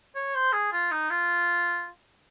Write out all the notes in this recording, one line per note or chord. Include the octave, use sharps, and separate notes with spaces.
C#5
C5
G#4
F4
D#4
F4